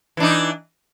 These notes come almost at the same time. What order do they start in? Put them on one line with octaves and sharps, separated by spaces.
E3 D4 D#4